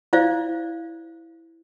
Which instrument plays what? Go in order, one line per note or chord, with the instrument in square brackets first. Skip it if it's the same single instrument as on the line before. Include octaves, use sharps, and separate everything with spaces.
[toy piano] E4 C5 D5 F5